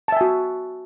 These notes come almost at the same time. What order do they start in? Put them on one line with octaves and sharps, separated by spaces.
A5 E5 G#5 F#4